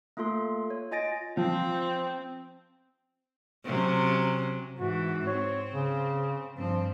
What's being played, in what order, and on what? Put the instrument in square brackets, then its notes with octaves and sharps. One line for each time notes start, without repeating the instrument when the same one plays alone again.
[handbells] A3 A#3 F4 A4 C6
C#5
F4 D#5 G#5 A6 A#6 D7
[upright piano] F3 [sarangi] C4
[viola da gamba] C3 F#3 C#4
[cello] G#2 E3 [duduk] F#4
[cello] C4 [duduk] C#5
[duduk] C#3
[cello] G2 C4 [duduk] F3